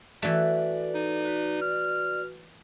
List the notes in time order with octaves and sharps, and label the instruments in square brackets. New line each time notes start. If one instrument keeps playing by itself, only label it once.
[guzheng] E3 A3 [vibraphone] F#4 A4 B4 [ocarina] D5
[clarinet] D#4
[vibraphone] F#4 B4
[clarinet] F6